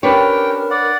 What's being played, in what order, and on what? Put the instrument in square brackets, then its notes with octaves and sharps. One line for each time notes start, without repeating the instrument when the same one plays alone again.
[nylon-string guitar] C#4 G4 [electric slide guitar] D4 B4 C#5 [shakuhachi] A#4 [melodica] G5
[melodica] D5 F#5